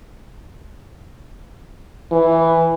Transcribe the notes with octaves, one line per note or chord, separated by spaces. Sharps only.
E3